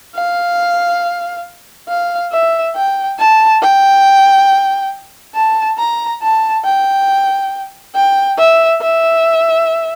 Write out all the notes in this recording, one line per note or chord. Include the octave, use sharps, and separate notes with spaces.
F5
F5
E5
G5
A5
G5
A5
A#5
A5
G5
G5
E5
E5